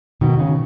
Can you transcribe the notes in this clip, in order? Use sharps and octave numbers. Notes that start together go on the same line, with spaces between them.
B2 D#3
C#3